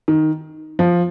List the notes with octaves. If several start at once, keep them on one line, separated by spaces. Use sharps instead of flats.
D#3
F3